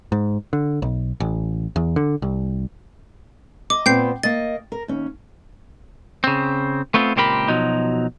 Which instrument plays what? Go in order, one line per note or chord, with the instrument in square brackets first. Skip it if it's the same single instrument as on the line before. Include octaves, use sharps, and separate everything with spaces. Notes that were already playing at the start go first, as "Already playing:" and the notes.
[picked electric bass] G#2
D3
B1
A1
E2
D3
C2
[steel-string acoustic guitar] D#5 [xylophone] D6
[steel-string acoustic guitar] A#2 B3 C4 [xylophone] G5 G6 C7
[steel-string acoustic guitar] A#3 D#5 [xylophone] A6
[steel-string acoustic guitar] A#4
D#2 C#4
[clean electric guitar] C#3 C4
A3 B3 C4 F4
C#2 A#2 C4 G4 A#4 B5
B2 F3 F#3 D#4